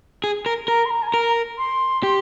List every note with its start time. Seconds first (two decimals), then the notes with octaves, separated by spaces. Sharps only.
0.24 G#4
0.46 A#4
0.68 A#4 A#5
0.85 C6
0.90 A#5
1.02 G#5
1.07 A#5
1.14 A#4
1.58 C6
2.03 G4